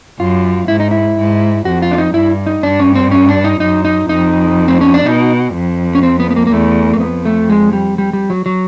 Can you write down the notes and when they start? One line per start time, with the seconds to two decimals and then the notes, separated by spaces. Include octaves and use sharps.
0.20 F#2 F4
0.68 G#2 E4
0.80 D#4
0.91 E4
1.18 G#2
1.65 F2 F#4
1.82 F4
1.91 D4
1.98 D#4
2.14 G2 E4
2.46 D#4
2.63 G2 D4
2.80 C#4
2.95 C4
3.12 C#4
3.28 D4
3.44 D#4
3.60 F#2 D#4
3.85 D#4
4.09 F2 D#4
4.68 C4
4.81 C#4
4.94 D4
5.06 B2 D#4
5.55 F2
5.95 C#4
6.03 C4
6.20 B3
6.31 B3
6.36 A#3
6.47 A#3
6.52 E2 A3
6.93 A#3
7.00 F2 B3
7.25 A3
7.50 G#3
7.73 G3
7.98 G3
8.13 G3
8.30 F#3
8.46 F#3